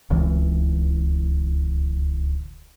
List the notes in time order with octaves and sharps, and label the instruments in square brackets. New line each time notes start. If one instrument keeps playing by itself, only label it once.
[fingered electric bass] D1 C#2 E3